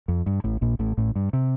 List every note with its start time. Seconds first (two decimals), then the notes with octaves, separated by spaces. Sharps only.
0.08 F2
0.26 G2
0.44 A1 A2
0.61 A#1 A#2
0.79 A1 A2
0.97 A1 A2
1.16 G2
1.33 C3